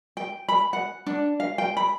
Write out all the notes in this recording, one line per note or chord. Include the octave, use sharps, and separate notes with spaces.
G5
B5
F#5
D4
F5
G5
B5